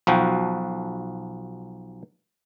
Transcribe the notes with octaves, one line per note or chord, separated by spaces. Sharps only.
B1 F3 F#4 G5